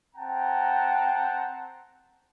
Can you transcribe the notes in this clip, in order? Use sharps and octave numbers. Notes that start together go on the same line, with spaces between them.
C4 F#5 G5 A5 A#5